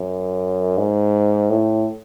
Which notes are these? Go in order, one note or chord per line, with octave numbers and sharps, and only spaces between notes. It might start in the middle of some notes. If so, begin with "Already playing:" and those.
Already playing: F#2
G#2
A2